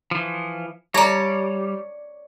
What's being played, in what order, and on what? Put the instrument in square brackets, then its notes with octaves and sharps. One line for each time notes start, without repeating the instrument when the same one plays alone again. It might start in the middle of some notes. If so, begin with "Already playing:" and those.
[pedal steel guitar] E3 F3
[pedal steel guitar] G3 [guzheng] C#5 D5 [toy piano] E5 A5 A#5